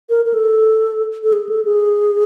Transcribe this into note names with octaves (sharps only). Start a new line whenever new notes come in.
A#4
A#4
A4
A4
G#4
A4
G#4